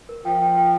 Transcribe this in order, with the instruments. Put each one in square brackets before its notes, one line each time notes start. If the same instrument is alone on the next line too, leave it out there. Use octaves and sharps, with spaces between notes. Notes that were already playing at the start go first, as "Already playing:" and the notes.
[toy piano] A#4
[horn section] F3 [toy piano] G5
[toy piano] G5
G5